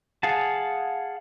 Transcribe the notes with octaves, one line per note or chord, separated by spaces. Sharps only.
G#4 F5 F#5 G#5 A5